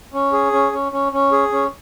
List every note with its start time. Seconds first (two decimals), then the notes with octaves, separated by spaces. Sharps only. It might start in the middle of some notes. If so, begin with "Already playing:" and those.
0.13 C#4
0.33 G#4
0.52 C#4
0.72 C#4
0.92 C#4
1.12 C#4
1.32 G#4
1.52 C#4